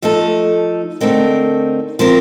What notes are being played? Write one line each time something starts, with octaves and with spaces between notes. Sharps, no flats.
F3 A3 D#4 A4
D3 A3 C4 D#4 A#4
F3 C4 F4 A#4